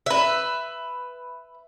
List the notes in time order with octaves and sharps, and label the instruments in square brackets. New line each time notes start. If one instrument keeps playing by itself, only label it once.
[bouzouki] B4 E5